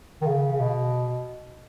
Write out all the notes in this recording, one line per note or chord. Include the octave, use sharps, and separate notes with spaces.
D#3
C#3
C#3
B2